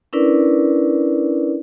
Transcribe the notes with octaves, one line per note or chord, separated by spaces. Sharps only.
C#4 D4 E4 A#4 B4 D5